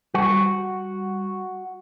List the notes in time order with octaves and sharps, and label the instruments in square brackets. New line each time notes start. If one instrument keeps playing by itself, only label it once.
[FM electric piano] G3 [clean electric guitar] F#4